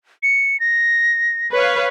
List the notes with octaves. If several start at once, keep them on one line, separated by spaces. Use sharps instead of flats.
C#7
A#6
B4 C#5 F5